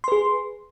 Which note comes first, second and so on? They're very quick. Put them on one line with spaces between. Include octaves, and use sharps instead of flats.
C6 B4 G#4